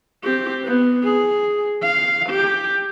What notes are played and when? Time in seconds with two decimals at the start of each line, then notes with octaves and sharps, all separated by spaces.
0.24 C4 G4
0.64 B3
1.04 G#4
1.82 F5
2.29 G4